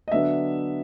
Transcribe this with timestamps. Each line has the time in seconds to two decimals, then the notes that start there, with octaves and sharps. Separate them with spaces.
0.08 D#5
0.12 D3 F#3 B3 D4 E5